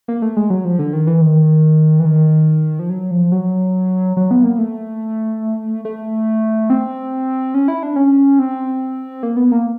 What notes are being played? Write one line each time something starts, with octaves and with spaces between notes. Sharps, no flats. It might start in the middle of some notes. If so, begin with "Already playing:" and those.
A#3
A3
G#3
F#3
F3
D3
D#3
E3
D#3
E3
D#3
F3
F#3
F3
F#3
F#3
B3
A#3
A3
A3
C4
C#4
E4
D4
C#4
C4
A#3
B3
A#3